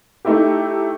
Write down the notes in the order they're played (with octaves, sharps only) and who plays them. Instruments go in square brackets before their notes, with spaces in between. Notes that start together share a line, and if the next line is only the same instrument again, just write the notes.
[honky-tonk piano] A3 D#4 E4 G4